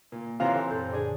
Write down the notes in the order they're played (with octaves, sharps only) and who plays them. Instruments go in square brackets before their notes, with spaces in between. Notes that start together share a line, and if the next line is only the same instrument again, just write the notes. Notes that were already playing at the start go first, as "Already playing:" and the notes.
[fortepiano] A#2
[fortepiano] C3 E3 A#5 [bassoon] F4 [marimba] C5 C#5 F5
[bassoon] C4 [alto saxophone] A4
[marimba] F#2 A#2 G6 [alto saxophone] A4
[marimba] D3 [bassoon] D4 [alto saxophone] G#4